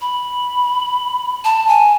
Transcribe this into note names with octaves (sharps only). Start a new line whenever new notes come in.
B5
A5
G#5